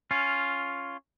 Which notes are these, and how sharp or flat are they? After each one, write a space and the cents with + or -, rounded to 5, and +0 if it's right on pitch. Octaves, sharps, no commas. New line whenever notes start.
C#4 +0 F4 +0